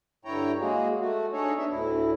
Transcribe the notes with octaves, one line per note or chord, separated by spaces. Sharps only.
G2 D3 E4 C#5 G5 A#5
G#3 A#3 F#4 G#4
A3 F#4
D4 D#4 G#4 A4 C#5
B3 D4 E5
D2 A2 E4